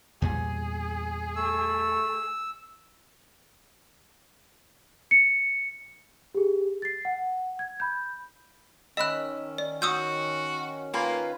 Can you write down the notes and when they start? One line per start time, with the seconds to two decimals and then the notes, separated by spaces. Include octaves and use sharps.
0.22 E2 A#2 G3 G#4
1.36 A3 E6
5.11 C#7
6.34 G4 G#4
6.82 A6 C7
7.05 F#5
7.59 G#6
7.80 B5 G6
8.97 D#3 C#4 D#5 E5 B5 F#6
9.58 D5
9.82 F#4 D#6 E6 G6
10.94 A#3 F4 B4 G#5